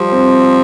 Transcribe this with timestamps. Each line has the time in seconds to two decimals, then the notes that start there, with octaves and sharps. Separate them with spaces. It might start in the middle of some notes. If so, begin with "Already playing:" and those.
Already playing: F3 G3
0.12 C4